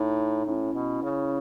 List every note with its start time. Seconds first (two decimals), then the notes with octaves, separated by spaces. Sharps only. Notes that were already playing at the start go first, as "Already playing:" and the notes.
Already playing: A2 D#4
0.46 A2 C#4 E4
0.74 B2
1.03 C#3